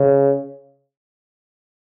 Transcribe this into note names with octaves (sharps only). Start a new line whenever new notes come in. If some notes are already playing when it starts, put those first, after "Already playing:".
Already playing: C#3